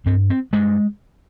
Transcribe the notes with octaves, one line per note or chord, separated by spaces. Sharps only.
G2 C4
C4
G2 G#3